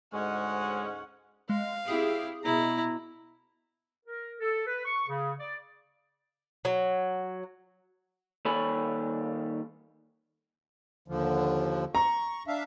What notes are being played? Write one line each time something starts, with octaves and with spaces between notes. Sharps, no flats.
D2 G#2 G#3 C#4 F#5
G#3 F5
C4 E4 G4 G#4
B2 E4 A#5
A#4
A4
B4
C#6
C#3
D5
F#3
D#2 G3 A4 C#5 G#5 B5
D#2 D3 F3
A#5 C#6
D4 E5 F5